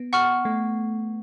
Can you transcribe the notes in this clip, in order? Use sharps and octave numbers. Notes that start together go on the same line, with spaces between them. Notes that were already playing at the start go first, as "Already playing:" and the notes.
Already playing: B3
F#5 C#6 F6
A3